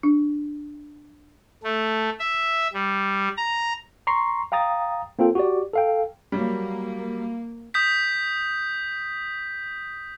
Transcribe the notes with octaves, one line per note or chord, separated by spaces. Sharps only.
D4
A3
E5
G3
A#5
A#5 C6 C#6 C7
F5 G5 A#5 D#6 A6
A#3 C4 F4 A4 G5
F#4 G4 D5
A4 F5 G5
F#3 G3 A#3
D#6 G6 B6